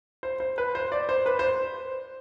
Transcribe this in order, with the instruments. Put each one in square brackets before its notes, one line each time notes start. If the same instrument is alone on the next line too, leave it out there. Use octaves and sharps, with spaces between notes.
[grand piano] C5
C5
B4
C5
D5
C5
B4
C5